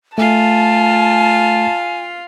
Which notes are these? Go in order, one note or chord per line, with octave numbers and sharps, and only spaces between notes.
A3 F4 F5 G#5 A5